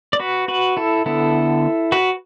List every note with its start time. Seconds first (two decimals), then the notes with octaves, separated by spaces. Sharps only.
0.13 D5
0.20 F#4 B4
0.48 F#4 B4
0.77 E4 A4
1.06 D3 B3 E4 A4
1.92 F#4 B4